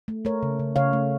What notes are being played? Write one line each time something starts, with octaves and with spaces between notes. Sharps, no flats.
A3
A3 A#4 C#5
C#3
C#3
C#3 C#5 F5
A3